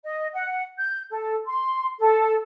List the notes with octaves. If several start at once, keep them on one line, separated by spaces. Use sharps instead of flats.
D#5
F#5
G6
A4
C6
A4